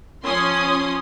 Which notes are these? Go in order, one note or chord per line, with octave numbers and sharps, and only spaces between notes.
F3 C#4 C6 D#6